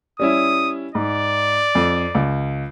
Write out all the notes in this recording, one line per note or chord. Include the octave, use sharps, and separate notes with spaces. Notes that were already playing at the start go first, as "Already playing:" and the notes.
G3 C#4 E4 D#6
G#2 D5
F2
C#2